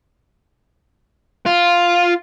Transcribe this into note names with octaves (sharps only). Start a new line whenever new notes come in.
F4